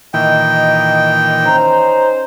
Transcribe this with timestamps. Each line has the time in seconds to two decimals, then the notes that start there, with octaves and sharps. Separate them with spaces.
0.14 A#2 D#3 E3 D#5 G5
1.45 C#4 D#4 C5 A#5